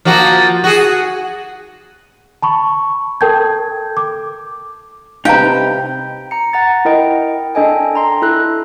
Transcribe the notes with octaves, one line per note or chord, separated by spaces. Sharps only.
F3 A#3 F#4
F#4 G#4
A5 B5 C#6
A4 A#4 G5 A5 G6 G#6
D6
C3 D#4 B4 F5 G5 A#5
A#5 C#7
F#5 A#5 A6
E4 A#4 D#5 G5
D4 A4 D#5 G5 G#5
A#5 C6
E4 A4 F#6